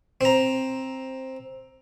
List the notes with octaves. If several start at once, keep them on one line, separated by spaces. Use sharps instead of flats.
C4 A#5